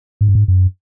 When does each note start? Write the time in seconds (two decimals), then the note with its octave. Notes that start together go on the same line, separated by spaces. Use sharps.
0.21 G#2
0.28 G2
0.35 G#2
0.48 F#2